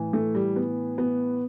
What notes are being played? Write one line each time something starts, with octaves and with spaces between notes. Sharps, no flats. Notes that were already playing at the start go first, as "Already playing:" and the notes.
Already playing: A2 E3
A3
G3
B3
B3